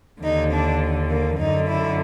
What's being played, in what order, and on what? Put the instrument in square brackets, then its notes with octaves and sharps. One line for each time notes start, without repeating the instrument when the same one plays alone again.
[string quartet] D#2 D3 D#4
D4
A#3
F#2 D3 D#4
E4